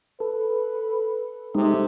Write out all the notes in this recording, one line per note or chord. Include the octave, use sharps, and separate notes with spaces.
A4 B4
C3 G#3 D#4